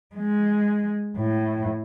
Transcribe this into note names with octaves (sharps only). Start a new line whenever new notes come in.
G#3
A2